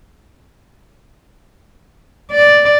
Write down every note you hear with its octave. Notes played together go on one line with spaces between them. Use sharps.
D5